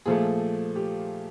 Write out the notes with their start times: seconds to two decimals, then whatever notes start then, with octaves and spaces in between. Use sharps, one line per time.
0.06 A#2 F3 A3 G#4
0.76 G4